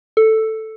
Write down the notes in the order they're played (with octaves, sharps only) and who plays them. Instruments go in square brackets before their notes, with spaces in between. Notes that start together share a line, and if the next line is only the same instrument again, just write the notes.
[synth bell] A4